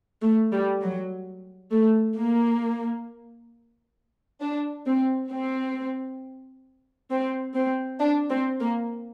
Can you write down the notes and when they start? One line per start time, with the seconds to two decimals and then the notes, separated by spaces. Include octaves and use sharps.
0.23 A3
0.52 G3
0.82 F#3
1.72 A3
2.17 A#3
4.41 D4
4.86 C4
5.31 C4
7.11 C4
7.55 C4
8.00 D4
8.30 C4
8.60 A#3